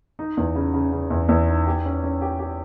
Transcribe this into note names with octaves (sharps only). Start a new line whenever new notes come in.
D#4
E2
C#3
C#3
C#3
E2
E2
D#4
G4
C#4
C#4
G4
G4